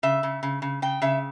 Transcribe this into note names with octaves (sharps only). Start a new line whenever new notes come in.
C#3 E5
C#3
C#3
C#3
C#3 G5
C#3 E5